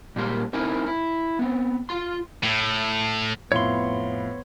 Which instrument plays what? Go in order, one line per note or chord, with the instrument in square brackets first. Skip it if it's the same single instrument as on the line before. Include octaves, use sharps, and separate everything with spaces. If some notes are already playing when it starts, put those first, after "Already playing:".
[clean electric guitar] A#2 G3 G#3 A#3 C6
C4 D#4 E4 A#4 G#5
E4
B3 C4
F4 C6
[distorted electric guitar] A2
[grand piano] F2 F5 [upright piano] A2 [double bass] B3 [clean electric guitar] C#5 C6